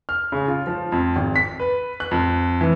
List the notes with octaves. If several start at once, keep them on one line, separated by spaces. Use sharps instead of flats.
F6
C#3
F4
F3
F2
G#1
B6
B4
F#6
F2
E3